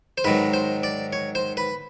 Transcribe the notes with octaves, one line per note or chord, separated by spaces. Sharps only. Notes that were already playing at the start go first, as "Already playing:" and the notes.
C5
G#2 D#3 F#3 B4
C5
D5
C#5
C5
B4